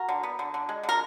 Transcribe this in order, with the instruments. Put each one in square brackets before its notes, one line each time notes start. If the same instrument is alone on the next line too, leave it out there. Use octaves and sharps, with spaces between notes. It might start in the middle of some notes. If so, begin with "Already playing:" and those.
Already playing: [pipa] F#4 A#4
D3
B3
D3
D3
G#3
D3
A#4